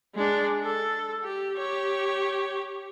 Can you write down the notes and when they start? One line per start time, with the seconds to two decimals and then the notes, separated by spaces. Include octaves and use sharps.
0.15 G#3 D4
0.63 A4
1.24 G4
1.57 G4 C#5